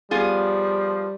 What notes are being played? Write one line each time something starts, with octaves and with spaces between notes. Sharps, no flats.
F3 G3 B3 F4 G#4